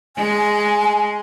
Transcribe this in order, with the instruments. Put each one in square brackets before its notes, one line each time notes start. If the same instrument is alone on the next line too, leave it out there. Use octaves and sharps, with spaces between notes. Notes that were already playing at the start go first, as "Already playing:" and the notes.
[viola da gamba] G#3 [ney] G#5